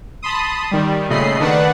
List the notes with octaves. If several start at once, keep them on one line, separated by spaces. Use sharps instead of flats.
A5 B5 C6 D#6
D#3 G3
A#2 C#3 A3 D#5 B5 C7
D#3 D4 B4 F#5